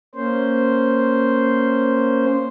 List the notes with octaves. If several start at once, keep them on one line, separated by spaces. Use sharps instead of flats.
A#3 C#4 C5